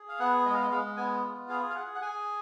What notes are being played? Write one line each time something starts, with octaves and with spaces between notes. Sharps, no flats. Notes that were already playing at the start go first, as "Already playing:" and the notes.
Already playing: G#4
F5
B3 F#5
G#3 D#5
F5
D#5
G#3 F5
B3 G#5
F4
G#4 F5
F5
G#4 F#5
F#5
G#4 G#5